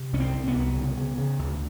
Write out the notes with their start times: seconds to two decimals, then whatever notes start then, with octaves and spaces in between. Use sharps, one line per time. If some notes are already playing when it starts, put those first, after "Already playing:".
Already playing: C3
0.13 C2 C#4
0.20 C4
0.34 C3
0.48 B3
0.55 C2
0.76 C#3
0.97 C#3
1.18 C#3
1.39 D2